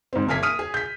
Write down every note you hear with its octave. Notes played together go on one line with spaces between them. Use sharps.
G#2 C4
F#1 A#3 A#4 G#5 B6
D#6 F6 D#7
G#4
G6 B6